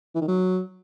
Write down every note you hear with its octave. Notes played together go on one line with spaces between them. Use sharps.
E3
D#3
F#3